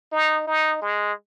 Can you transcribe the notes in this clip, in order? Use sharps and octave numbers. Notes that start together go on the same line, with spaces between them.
D#4
D#4
G#3